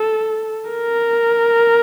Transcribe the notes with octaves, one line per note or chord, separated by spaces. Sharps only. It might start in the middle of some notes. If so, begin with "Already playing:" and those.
Already playing: A4
A#4